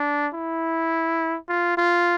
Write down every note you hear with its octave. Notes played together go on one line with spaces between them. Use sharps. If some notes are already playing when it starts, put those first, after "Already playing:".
Already playing: D4
E4
F4
F4